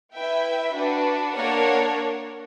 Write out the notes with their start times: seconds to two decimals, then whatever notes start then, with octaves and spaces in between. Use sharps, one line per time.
0.13 E4 B4 E5 G5
0.73 D4 F#4 B4
1.34 A#3 D4 A#4 C#5 F#5